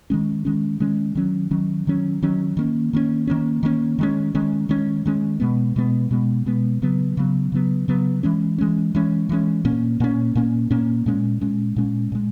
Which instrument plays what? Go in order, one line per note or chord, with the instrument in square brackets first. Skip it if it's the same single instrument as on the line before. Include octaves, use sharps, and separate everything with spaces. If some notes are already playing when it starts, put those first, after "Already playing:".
[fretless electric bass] D#3 G#3 C#4
D#3 G#3 C#4
D#3 G#3 C#4
D#3 F#3 C#4
D#3 F#3 C#4
D#3 F#3 C#4
D#3 F#3 C#4
D#3 A#3 C#4
D#3 A#3 C#4
D#3 A#3 C#4
D#3 A#3 C#4
D#3 G#3 C#4
D#3 G#3 C#4
D#3 G#3 C#4
D#3 G#3 C#4
B2 G#3 B3
B2 G#3 B3
B2 G#3 B3
B2 G#3 B3
C#3 F#3 B3
C#3 F#3 B3
C#3 F#3 B3
C#3 F#3 B3
E3 G#3 C#4
E3 G#3 C#4
E3 G#3 C#4
E3 G#3 C#4
A#2 A#3 C#4
A#2 A#3 C#4
A#2 A#3 C#4
A#2 A#3 C#4
A#2 G#3 C#4
A#2 G#3 C#4
A#2 G#3 C#4
A#2 G#3